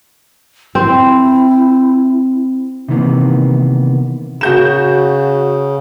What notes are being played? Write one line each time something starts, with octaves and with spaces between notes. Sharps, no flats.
C4 E4
C3 D#3 E3 A#3 B3
C#3 F#4 G6 E7